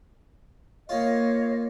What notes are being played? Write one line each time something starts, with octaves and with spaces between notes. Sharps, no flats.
A#3 F4 C#5 D#5 F5